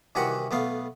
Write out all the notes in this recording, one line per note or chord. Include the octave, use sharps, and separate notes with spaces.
C2 D#3 E3 F#4 G4 F#5
B1 A3 B3 F5